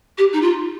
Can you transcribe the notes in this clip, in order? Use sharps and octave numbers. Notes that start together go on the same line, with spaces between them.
G4
D#4
F4